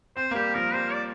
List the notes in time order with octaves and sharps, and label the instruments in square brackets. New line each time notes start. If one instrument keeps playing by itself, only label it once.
[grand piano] C4 [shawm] C5
[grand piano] A#3
[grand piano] G3 [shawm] G4
[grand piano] F3 [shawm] A#4
[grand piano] G3 [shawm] C5
[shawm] D5